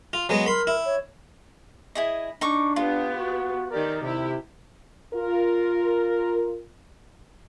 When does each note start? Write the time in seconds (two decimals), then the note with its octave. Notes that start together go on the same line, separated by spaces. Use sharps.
0.13 F4
0.29 F#3 G#3 B3
0.46 A#4 B5 C6
0.67 E4
0.85 C#5
1.95 E4 G#4 D#5
2.41 D4 D#4 C#6 D6
2.76 B3 F4 G4
3.17 F#4
3.70 D#3 G4 A#4 D5
4.02 C3 E4 G4
5.14 F4 A#4